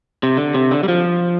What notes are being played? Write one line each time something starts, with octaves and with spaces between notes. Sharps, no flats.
C3
D3
C3
D3
G3
F3